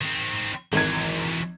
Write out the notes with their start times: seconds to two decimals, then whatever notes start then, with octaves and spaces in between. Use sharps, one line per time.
0.01 D#3 C4
0.73 G#1 E3 F#3 G#6